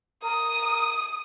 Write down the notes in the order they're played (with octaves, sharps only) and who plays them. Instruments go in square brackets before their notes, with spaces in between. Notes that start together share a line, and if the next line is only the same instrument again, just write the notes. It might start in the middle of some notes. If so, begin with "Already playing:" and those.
[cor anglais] A#4 [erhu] D#6